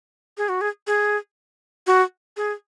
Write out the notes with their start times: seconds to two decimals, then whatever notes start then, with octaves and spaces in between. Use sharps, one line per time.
0.38 G#4
0.49 F#4
0.61 G#4
0.87 G#4
1.87 F#4
2.37 G#4